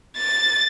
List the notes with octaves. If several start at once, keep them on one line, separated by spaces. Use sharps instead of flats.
A6